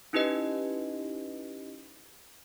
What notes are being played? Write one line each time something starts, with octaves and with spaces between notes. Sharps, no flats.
C#4 D#4 E4 G4 B4 D#5